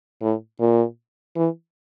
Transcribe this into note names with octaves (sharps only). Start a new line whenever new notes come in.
A2
A#2
E3